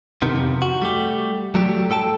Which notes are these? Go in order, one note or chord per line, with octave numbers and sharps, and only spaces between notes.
C3 D#3 B3
F2 C3
F#4
G3 A3 G4
F#3 G3 A3 G4
A2 A4 G5 A5